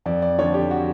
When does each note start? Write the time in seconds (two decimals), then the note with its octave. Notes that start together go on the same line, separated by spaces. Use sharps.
0.06 F2 D5
0.22 D5
0.38 D3 F3 C#5
0.54 G4
0.71 F#4